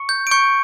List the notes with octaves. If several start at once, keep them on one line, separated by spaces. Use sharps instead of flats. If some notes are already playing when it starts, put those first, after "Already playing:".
Already playing: C#6 C#7
G6
D7
C#6 G6 C#7